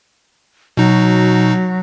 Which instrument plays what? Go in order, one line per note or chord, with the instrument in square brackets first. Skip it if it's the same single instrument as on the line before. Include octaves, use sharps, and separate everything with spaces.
[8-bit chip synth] B2 D#4 [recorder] F#3